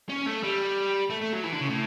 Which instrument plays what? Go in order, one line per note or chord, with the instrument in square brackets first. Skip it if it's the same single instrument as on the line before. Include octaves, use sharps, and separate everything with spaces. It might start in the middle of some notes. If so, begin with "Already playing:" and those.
[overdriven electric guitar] C#4
A3
G3
A3
A3
F#3
E3
D3
C#3
A2